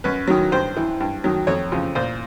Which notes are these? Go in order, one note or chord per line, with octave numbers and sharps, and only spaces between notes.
F#2 B4
D#3 F#3
G2 C5
E3
G2
D#3 F#3
F2 C#5
C#3 F3
A#2 C5